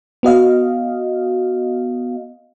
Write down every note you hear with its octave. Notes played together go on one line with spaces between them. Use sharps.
B3 F#4 D#5 F5